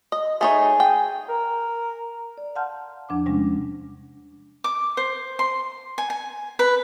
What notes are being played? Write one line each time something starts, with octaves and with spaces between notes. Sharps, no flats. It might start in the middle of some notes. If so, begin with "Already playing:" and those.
D#5
A3 D#4 G#4 C#5
G5
A#4
D5
F5 F#5 A5 C6 F6 G6
E2 F3 D4 F#5 D6
C3 G3 G#3 C#4 D4
D6
C5
C6
G#5
G#5
B4